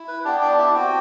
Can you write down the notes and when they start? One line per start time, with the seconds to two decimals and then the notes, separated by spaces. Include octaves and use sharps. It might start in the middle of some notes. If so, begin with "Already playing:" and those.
Already playing: E4
0.08 B4
0.25 B3 D4 G4 D5
0.41 D4 D5
0.58 E4 E5
0.75 C4 F#4 G4 G5